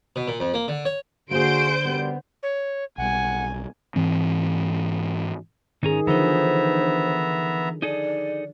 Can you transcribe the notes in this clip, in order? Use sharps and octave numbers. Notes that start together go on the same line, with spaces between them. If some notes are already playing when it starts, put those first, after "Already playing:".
B2
A#2
F2
A#3
D3
C#5
D3 A#3 F#4 G#4 C5 G6 D7
F#2 G3 B3
C#5
B1 G3 F#5 G#5
G#2 E3 C4
G#2 D#3 C#4 G#4 A#5
D3 E3 F3 B3 D#4 C5 E5 A#5
D#4 G#4 A4 D5